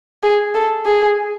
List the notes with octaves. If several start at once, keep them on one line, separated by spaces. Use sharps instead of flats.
G#4
A4
G#4